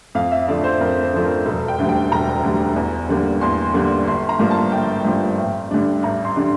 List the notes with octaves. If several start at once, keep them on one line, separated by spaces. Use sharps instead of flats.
F2 F5
E5
D3 F3 A3 D5
C5
F2 A#4
C5
D3 F3 A3
A#4
E1 A4
G5
D2 D3 G3
G5
E1 A#5
D2 D3 G3
E2
D3 G3 A#3
E2 C6
D3 G3 A#3
G1 C6
A#5
G2 F3 A#3
A5
G1 G5
G2 F3 A#3
A1
G2 D3 G3 D4
A1 A#5
C6
D3 G3 D4